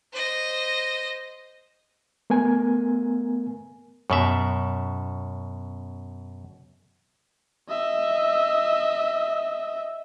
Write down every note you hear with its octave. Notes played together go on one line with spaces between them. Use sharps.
C5 D#5
A3 B3 A#4 G#5
F#2 B2 E5
D#5 E5